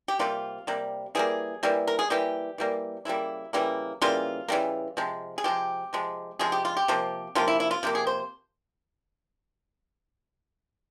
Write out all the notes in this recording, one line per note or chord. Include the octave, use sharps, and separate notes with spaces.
G4
C3 G3 A#3 F4
C3 G3 A#3
E3 G3 A#3 G#4
E3 G3 A#3
A#4
G#4
E3 G3 A#3 G4
E3 G3 A#3
C#3 E3 G3 A#3 E4
C#3 E3 G3 A#3
C#3 E3 G3 A#3 F4
C#3 E3 G3 A#3
C3 F3 G#3
G#4
C3 F3 G#3 G4
C3 F3 G#3
C3 F3 G#3 G#4
G4
F4
G4
C3 F3 A#3
C3 F3 A#3 F4
E4
E4
F4
C3 F3 A#3 G4
G#4
C5